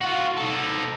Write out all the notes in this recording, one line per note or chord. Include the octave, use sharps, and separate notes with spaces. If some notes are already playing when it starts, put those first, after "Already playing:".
F4 F#4
D#4 A4